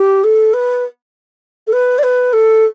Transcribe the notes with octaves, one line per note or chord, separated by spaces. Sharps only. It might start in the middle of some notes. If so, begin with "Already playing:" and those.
Already playing: G4
A4
B4
A4
B4
D5
B4
A4